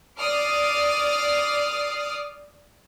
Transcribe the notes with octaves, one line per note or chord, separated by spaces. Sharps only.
D5 D6 D#6 F6 C7